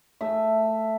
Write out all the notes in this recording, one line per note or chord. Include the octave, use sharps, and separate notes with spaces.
A3 E5